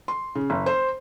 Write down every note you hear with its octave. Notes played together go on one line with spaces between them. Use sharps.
C6
C#3
F#1
C5